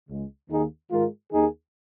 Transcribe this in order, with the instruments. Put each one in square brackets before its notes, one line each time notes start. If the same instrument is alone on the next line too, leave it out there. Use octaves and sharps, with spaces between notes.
[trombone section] C#2 C#3 G#3
D#2 D#3 A#3 D#4 G#4
G#2 D#3 G#3 F4 A#4
D#2 D#3 A#3 D#4 G#4